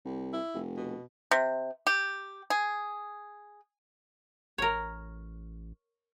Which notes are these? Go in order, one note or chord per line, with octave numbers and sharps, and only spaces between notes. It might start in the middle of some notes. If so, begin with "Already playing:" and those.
C2
E4
F1
B2
C3
G4
G#4
A1 A#4 C#5